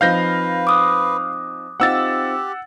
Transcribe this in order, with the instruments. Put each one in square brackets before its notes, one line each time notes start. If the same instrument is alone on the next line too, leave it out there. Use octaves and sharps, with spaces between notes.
[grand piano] F3 C4 D#4 [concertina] B4 [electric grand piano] F5 G6 A#6
[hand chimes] D6 D#6 F#6
[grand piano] C4 D#4 F4 [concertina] G4 [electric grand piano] F#5 E6 A6